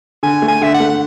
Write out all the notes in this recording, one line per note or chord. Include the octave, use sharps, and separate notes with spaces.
D3 G#5
A3
G#5
D3 E5
F#5
A3
F#5